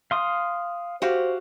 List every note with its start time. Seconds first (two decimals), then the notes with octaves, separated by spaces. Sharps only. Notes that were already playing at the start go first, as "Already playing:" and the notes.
0.11 F5 C6 D#6
1.02 F#4 G4 C5 F5